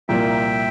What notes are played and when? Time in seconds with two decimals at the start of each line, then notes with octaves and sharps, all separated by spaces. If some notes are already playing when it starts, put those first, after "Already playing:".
0.09 C2 A#2 F3 A#3 E5 G5